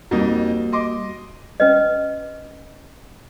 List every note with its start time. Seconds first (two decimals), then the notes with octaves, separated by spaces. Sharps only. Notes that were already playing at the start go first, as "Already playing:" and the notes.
0.11 F2 G3 A#3 D#4 F#4
0.73 D#5 C6 D6
1.60 C#4 B4 D#5